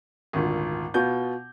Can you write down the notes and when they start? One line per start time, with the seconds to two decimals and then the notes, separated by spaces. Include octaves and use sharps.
0.33 G#1 D2 A#2
0.94 B2 B3 F4 G6